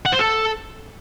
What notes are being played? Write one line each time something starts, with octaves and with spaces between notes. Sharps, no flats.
F#5
C5
A4